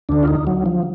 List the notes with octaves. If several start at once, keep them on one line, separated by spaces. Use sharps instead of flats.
D2 D3 D4
F4
D#4
F#3
F3